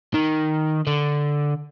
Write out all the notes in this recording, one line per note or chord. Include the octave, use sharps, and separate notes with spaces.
D#3
D3